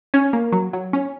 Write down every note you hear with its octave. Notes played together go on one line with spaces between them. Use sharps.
C#4
A#3
F#3
F#3
C#4